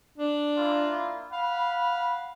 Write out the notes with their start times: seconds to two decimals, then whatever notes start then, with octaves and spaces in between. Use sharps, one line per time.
0.18 D4
0.57 A#3 E4 F4
1.32 F5 F#5 B5